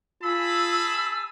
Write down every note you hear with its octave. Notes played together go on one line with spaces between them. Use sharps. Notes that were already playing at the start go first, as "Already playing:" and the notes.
F4 G#4 A5 B5 E6